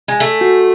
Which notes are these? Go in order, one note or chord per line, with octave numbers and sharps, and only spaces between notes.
G#3
A3 G#5
F#4